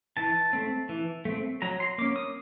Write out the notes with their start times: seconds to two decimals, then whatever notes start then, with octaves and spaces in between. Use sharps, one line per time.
0.17 E3 A5
0.53 A3 C4
0.89 E3
1.25 A3 C4
1.62 F#3 A#5
1.80 C6
1.98 A#3 C#4 D6
2.16 D#6